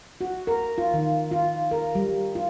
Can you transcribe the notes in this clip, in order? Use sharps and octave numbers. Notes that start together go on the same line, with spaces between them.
F#4
A#4
F4
D#3
F4
A#4
G3
F4